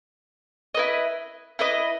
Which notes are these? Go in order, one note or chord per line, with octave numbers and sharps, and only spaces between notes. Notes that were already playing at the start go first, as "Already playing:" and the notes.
E4 B4 D#5
E4 B4 D#5